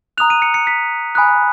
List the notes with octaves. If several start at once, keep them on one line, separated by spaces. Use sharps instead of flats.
A#5 D#6 F#6 F7
D#7
C#7
C#7
B6
G#5 B5 D#6 F#6